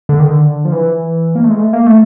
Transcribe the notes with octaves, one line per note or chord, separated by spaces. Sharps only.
D3
D#3
D3
F3
E3
A#3
A3
G#3
A3
A#3
A3